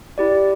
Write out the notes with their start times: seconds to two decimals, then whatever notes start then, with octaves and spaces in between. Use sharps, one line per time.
0.18 E4 G4 D5